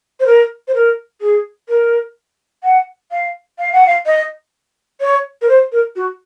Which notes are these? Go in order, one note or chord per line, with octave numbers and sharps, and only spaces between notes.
C5
A#4
C5
A#4
G#4
A#4
F#5
F5
F5
F#5
F5
D#5
C#5
A#4
C5
A#4
F#4